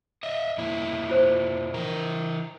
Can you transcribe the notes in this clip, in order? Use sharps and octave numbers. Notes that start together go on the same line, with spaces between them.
D#5 E5
F2 A#2 E4
F4 C5
E3 A#4